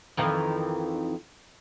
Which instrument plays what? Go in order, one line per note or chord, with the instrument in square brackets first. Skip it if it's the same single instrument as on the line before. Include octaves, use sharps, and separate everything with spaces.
[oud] F2 D#3 E3